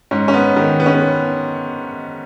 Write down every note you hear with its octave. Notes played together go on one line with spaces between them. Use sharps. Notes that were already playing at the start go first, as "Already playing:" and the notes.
G#2 C#4
C#4
B3
D#3
B3
C#4
B3